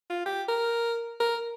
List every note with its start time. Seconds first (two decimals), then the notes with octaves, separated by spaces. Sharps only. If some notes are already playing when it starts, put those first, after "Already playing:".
0.10 F4
0.26 G4
0.48 A#4
1.20 A#4